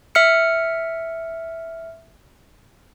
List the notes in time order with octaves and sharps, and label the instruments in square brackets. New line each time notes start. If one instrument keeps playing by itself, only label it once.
[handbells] E5 F6 C#7